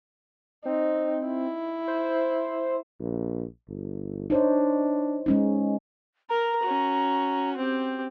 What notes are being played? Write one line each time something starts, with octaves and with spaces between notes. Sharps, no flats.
C4 D#4
E4
C5
A#1
G1
D4 D#4 C5 C#5
G#3 C#4 D#4
A#4 A#5
C#4 F#4
C4 G4